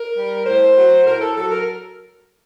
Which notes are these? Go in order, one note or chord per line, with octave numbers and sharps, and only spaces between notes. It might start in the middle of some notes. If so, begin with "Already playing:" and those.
Already playing: A#4
G3
A2 C5
F#3
A2 A#4
A4
F#3 A4
A#4